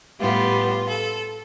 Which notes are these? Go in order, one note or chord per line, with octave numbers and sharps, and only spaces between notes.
A2 G3 B3 F4
A4